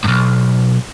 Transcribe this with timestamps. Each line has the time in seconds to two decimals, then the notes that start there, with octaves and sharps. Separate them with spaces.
0.04 B1 G2